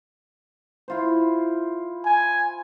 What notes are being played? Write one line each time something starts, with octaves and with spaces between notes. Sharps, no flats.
E4 F4 C5
G#5